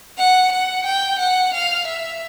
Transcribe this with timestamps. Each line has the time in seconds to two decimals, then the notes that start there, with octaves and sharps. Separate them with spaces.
0.18 F#5
0.52 F#5
0.86 G5
1.19 F#5
1.54 F5
1.87 E5